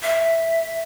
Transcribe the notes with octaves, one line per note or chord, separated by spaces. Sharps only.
E5